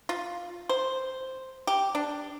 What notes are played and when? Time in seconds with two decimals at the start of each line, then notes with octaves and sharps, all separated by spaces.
0.09 F4
0.69 C5
1.67 G4
1.95 D4